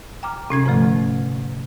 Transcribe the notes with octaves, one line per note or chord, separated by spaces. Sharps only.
G5 A#5 D6 F6
C3 C#4 G#6
G#2 D3 F3 A3